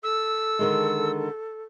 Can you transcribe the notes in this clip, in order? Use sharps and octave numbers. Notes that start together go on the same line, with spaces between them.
A4 E6
D3 D#3 G#3